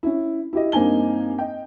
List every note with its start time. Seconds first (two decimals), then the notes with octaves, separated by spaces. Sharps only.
0.03 C#4 E4
0.53 E4 G4 D#5
0.72 G2 A#3 C4 D#4 G#5 G7
1.39 D#5 G5